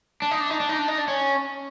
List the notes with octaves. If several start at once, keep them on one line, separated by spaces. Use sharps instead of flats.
D4
D#4
D4
D#4
D4
D#4
D4
D#4
D4
C#4